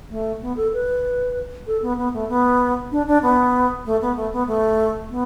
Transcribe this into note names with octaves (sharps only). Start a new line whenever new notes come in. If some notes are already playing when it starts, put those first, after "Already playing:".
A3
B3
A4
B4
A4
B3
B3
A3
B3
D4
D4
B3
A3
B3
A3
B3
A3
B3